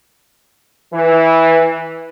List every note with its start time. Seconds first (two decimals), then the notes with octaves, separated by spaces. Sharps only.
0.93 E3